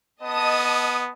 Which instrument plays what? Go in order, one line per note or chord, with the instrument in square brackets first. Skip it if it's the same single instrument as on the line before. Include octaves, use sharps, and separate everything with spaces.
[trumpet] B3 [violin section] D#5 A5 D#6